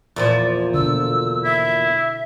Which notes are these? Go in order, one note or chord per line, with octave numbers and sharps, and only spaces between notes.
E2 A#2 F3
B2 D3 E6
E4 E5